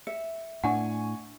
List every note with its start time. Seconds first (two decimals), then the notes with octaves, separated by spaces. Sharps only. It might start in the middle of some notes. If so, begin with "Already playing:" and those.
0.07 E5 C#7
0.64 A2 D4 F#5 G#5 C#6